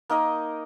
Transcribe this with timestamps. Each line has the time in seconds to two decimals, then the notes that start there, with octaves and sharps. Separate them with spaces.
0.10 A#3 D#4 A#4 D#5